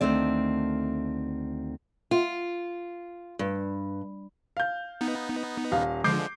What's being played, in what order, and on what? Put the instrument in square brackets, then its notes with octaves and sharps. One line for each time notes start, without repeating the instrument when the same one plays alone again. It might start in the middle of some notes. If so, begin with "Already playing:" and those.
[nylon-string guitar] D2 D#3 A3 C4 D5
[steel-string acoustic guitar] F4
G2
[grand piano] F5 G6
[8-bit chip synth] B3 D#4
[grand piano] D#1 F5
[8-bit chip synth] D3 F3 G#3 [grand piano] D6 G6 C7